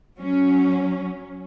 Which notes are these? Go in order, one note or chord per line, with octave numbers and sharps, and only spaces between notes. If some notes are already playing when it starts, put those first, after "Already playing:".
F#3 C#4